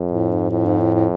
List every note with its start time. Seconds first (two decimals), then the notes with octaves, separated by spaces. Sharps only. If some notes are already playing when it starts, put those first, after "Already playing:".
Already playing: F2
0.12 A2
0.32 G#2
0.51 F2 A2
0.66 G#2
0.81 A2
0.95 A2